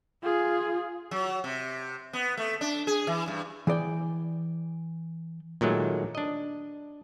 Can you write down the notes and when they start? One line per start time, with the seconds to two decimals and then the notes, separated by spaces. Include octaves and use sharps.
0.23 F4 G#4
1.11 F#3
1.44 C3
2.13 B3
2.37 A3
2.61 D4
2.87 G#4
3.07 E3
3.28 G2
3.67 E3 G#4 D5 G5
5.61 A#2 D#3 F#3 G#3 A3
6.15 D4 D#5